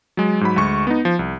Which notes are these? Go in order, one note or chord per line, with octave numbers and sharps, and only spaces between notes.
F#3 G#3
G#2 F#3 B5
D2 G#3 C#6
B3 D#4
F3
C2